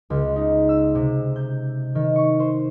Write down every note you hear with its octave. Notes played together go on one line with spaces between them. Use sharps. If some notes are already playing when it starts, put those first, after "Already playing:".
C#2
D#4
E6
C3
G6
D#3
C#6
C5